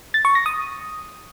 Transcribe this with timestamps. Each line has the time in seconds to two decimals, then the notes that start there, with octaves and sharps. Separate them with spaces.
0.14 A6
0.25 C#6
0.35 A#6
0.46 D#6